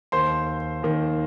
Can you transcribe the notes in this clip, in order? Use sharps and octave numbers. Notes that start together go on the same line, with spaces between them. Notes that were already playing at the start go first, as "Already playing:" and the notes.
D#2 D#3 C5 C6
D#2 D#3